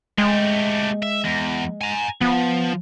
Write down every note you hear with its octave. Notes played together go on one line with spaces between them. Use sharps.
G#3 A3 G4
E5
E2
G#5 A#5
F3 B3